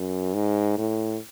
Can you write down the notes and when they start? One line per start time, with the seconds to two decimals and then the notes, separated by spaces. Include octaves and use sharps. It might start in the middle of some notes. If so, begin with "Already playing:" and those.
Already playing: F#2
0.34 G#2
0.78 A2